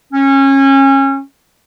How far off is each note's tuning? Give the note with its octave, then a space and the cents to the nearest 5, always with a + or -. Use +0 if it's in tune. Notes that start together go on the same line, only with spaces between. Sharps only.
C#4 -25